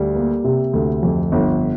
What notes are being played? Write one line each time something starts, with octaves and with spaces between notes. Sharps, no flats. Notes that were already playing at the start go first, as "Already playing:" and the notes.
Already playing: D2 G3
A#3
C3
D2
F2
G1